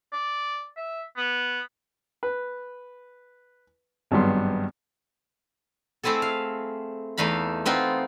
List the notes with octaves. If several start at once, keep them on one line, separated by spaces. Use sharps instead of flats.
D5
E5
B3
B4
G#1 G2 F#3 G3 B3 C6
A3 C4 E4 G#4 A4
F5
E2 A3 D#4 F5 B5
B3 C4 D#4 F4